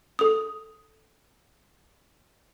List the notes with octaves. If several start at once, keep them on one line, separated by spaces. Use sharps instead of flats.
A4 D#6